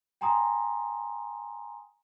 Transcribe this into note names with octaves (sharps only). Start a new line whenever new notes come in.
G5 G#5 A#5 C6 D#6